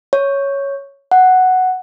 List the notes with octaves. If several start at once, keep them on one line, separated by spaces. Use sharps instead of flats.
C#5
F#5